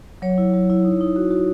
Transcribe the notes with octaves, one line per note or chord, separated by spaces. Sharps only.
F#3 C#5
E4
F#3
E4
D#4
D#4
F#4
F#4